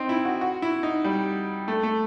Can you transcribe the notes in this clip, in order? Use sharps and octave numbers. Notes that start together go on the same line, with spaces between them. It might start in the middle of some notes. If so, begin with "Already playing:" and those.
Already playing: C4 D#4
E4
F#4
F#4
E4
D#4
G3
A3
A3